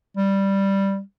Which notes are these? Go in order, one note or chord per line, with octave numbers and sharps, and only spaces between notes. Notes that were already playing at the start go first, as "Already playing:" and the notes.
G3